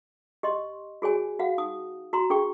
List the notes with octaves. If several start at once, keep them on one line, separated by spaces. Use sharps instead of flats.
G4 D#5 C6
F#4 G#4 C#5 G#5
F#4 F5 F#5
D#4 D#6
F#4 A#5 C6
D4 G#4 G5 C#6